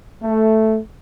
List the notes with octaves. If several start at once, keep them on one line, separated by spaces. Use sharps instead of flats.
A3